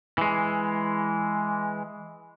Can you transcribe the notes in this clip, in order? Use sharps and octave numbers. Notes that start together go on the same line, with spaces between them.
E3 G#3